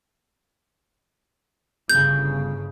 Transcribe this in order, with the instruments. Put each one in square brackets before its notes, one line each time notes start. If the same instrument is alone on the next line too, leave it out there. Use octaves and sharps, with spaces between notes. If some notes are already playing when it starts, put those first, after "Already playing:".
[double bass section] G1 C#3 [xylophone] G6